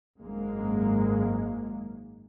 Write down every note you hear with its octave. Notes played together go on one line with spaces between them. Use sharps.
G#1 F#2 G#3 A#3